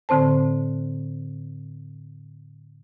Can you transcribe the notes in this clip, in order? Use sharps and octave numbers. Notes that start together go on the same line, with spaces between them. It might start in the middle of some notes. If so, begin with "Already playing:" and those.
A2 D3 C4 C5 A5